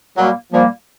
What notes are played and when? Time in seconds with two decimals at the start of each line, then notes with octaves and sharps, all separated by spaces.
0.17 A#2 F#3 G3 A#3
0.52 A#2 F3 G3 A#3